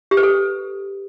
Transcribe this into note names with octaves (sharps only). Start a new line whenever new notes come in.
G4
B4
A4